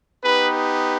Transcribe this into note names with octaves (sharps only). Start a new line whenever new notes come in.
B3 D#4 G4 B4